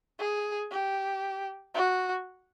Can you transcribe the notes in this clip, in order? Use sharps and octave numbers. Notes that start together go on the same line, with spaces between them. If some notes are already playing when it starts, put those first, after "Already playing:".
G#4
G4
F#4